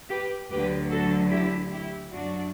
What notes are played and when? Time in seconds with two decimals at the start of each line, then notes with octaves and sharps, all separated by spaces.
0.09 G4 B4
0.50 D2 D3 F#3 G4 B4
0.90 F#4 A4
1.31 E4 G4
1.71 E4 G4
2.12 F#2 F#3 D4 F#4